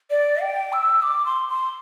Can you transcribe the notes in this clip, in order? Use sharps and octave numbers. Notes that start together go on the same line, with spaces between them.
D5
G5
E6
D6
C6
C6